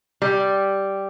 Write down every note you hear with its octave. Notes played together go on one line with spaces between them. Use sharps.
G3